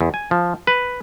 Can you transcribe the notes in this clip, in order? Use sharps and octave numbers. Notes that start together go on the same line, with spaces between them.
E2
G#5
F3
B4